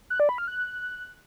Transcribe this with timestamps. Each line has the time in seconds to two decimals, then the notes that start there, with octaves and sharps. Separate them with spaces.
0.10 F#6
0.20 D5
0.29 B5
0.38 F6
0.48 F#6